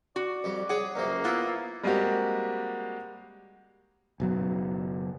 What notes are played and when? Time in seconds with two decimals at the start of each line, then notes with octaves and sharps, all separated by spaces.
0.16 F#4 D5
0.44 F2 G3
0.69 G#4 C#5 F#5 D6
0.96 C#2 F#2 F3 A#3
1.24 B3 E4 F4 E5 F#5
1.83 G3 G#3 A#3 C4 F#4 G4
4.20 F#1 B2 F#3